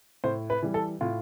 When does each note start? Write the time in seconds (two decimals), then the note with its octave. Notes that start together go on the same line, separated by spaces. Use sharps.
0.24 A2 C5
0.50 B4
0.62 E3 G3
0.74 A4
1.01 A2 F4